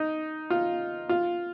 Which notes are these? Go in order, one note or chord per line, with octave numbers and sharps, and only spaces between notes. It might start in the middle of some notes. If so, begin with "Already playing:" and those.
Already playing: D#4
F4
F4